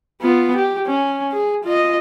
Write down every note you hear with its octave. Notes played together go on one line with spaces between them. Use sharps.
B3 F4
G4
C#4
G#4
F4 D#5